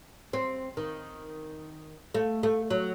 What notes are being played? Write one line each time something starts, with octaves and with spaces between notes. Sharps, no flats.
C4
D#3
A3
A3
F#3